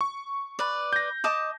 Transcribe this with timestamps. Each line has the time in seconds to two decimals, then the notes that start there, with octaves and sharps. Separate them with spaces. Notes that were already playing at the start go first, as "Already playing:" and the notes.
0.01 C#6
0.59 B4 D5
0.93 G6 A#6
1.24 D#5 A5 D6